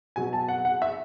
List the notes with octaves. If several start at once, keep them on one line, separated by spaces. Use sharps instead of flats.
B2 F#3 G#5
A5
F#5
F#5
E5